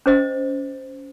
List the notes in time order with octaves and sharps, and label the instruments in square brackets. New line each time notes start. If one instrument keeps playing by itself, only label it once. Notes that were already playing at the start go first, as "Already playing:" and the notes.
[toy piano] C#4 C5 D#5